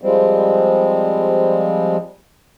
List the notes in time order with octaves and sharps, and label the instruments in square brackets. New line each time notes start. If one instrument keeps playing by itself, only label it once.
[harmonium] F3 G3 G#3 C4